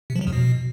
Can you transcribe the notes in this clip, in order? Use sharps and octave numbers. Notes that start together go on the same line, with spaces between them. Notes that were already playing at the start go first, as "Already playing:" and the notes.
C3
F3
F#3
E2
B2